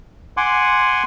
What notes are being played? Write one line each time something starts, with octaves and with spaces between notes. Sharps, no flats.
F#5 G#5 C6 D6